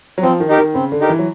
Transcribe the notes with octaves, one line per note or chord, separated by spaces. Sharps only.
F#3
F3 C4
D#3
D#4 G4 A#4
D#3
C#3 C4
D3
D#4 G4 A#4
E3
F#3